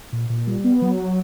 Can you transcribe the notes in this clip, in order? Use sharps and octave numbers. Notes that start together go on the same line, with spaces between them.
A#2
A#2
G3
B3
F#3